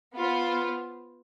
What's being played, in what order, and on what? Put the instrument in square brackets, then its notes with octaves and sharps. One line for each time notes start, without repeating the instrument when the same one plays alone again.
[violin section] B3 F4 C5